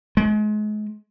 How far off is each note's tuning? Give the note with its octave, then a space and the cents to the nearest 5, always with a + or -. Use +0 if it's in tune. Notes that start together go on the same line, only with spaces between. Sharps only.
G#3 +35